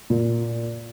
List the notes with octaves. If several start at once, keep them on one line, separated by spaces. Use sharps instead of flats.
A#2